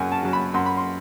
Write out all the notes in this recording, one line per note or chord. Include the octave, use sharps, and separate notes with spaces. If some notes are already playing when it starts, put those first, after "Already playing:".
Already playing: F#2 C#3 F#3 G#5
A5
C#3 F#3
B5
F#2 C6
B5
C6